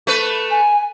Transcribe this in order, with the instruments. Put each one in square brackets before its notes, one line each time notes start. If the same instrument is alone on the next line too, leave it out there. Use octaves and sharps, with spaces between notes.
[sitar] A3 B4
[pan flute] G#5